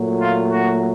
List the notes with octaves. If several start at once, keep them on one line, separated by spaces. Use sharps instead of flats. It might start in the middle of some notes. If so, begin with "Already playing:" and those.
Already playing: A#2 F#3 A3
F4
F#4